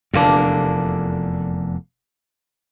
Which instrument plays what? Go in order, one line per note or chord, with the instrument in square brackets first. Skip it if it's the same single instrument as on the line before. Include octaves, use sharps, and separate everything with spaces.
[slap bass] F1 E2 [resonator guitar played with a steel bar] D3 A#3 D4